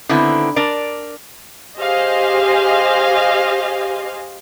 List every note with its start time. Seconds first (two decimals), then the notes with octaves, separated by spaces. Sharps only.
0.09 D3 D#3 B3 C4 E4
0.56 D4 A#4 D5
1.78 G4 G#4 C5 D#5 F5 G#5